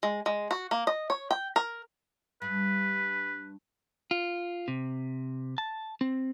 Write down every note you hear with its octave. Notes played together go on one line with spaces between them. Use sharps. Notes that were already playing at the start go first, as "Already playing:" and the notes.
G#3
G#3
F#4
A#3
D#5
C#5
G5
A#4
G2 B4
F4
C3
A5
C4